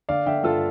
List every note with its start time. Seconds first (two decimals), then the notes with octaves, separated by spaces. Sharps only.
0.09 D3 D5 F5
0.26 D3 E5 G5
0.43 G2 F4 A4